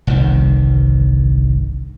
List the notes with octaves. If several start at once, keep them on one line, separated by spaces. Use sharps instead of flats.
G1 C2 G2 D#3